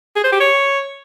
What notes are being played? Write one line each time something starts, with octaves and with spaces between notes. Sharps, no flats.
G#4
C5
G4
C#5